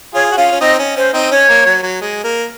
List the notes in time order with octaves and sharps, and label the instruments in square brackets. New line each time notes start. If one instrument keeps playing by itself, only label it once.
[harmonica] F4 G#4 [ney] C#5
[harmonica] F#4
[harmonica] C#4 F4 [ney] F5
[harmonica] C#4
[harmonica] C4 D#4 [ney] D#5
[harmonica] C#4
[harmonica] C#4 [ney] C5
[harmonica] C4 D#4
[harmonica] C#4 [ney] C#5
[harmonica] A#3
F#3
F#3
G#3
A#3